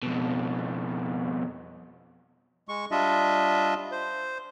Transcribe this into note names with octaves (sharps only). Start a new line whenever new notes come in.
F2 B2
G#3 C#6
G3 D4 F4 D#5 E5
C5